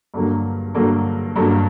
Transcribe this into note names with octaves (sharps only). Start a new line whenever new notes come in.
G2 D3 F#3 A#3
G2 D3 F#3 A#3
G2 D3 F#3 A#3